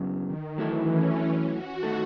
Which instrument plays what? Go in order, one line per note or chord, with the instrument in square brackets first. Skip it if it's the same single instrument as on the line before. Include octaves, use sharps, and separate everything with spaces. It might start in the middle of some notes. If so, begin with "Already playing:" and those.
Already playing: [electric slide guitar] F#2 C#3 F#3 B3
[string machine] D#3
[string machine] E3 [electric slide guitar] F#3 A3 E4 A4
[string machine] C#4
F#4
[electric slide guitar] D#3 A3 D#4 A4